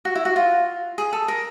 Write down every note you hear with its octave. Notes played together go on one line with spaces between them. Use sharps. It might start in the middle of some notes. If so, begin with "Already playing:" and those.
F#4
E4
F#4
F4
G#4
A4
A#4